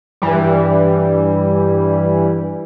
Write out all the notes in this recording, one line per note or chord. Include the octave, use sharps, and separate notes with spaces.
G2 E3 G3